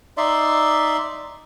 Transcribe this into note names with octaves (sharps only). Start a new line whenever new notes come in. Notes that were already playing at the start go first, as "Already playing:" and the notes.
D#4 D5 E5 C6